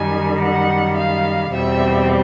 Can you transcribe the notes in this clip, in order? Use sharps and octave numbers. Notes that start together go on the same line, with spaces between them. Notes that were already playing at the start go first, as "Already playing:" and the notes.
Already playing: F#2 D#3 G3 G#5
F#5
F5
E2 B2 G3 C4 E5